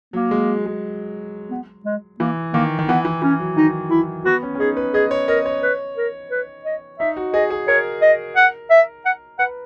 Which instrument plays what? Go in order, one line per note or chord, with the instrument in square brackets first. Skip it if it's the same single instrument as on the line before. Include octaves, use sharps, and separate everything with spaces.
[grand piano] F#3 [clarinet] A#3
[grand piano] G#3
G#3
[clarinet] B3
G#3
[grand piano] E3 [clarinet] A#3
[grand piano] D#3 [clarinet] A#3
[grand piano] D#3
[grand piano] E3 [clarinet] B3
[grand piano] E3
[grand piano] E3 [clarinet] C#4
[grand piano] F#3
[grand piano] D#3 [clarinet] D#4
[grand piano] E3 [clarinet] E4
[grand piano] B3 [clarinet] F#4
[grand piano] C#4
C#4
[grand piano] D#4 [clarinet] G#4
[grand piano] B4
[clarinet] G#4 [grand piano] D#5
[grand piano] C#5
[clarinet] A#4 [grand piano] D#5
[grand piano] C#5
[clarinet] B4
A#4
B4
D#5
[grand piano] D#4 [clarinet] E5
[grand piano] F#4
[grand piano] G#4 [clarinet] D#5
[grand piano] G#4
[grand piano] A#4 [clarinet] C#5
[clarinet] D#5
F#5
E5
F#5
[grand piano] B4 [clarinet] F#5